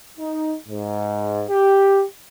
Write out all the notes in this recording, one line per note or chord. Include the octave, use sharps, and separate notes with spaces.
D#4
G#2
G4